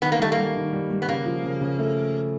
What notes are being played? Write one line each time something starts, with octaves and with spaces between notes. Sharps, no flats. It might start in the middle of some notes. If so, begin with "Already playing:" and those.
D#3 B3
A#3
G3 A3
A#3
G3
D#3
G3
G3
B3
C#3 A#3
F3
C#3
C#3
A3